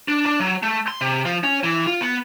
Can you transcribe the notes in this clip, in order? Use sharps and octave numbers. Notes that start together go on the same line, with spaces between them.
D4
D4
F#3
A3
C6
C3
F3
C#4
E3
F4
B3